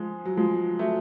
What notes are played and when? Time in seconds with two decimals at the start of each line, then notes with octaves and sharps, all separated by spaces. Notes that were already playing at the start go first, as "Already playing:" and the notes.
Already playing: F3 G#3
0.25 F#3
0.37 F3 G#3
0.79 F#3 A3